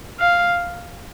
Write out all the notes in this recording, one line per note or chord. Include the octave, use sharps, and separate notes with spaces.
F5